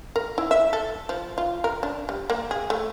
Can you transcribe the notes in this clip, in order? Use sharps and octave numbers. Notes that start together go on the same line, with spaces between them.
A#4
E4
E5
A4
F3
F4
A#4
D4
G3
A#3
G#4
A3